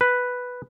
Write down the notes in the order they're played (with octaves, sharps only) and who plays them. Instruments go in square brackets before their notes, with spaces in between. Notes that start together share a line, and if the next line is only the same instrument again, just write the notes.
[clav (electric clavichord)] B4